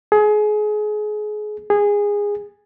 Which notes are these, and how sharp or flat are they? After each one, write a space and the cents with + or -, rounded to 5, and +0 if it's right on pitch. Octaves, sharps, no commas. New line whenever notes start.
G#4 +30
G#4 -15